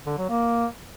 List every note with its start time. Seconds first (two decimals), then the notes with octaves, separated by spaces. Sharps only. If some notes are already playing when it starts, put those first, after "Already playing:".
0.06 D3
0.18 F#3
0.30 A#3